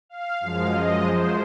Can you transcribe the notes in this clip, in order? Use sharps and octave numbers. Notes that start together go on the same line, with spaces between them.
F5
F#2 F3 G#3 F5
D#5
C5